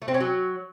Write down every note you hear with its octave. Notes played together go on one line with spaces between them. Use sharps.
A3
C4
C#4
F#3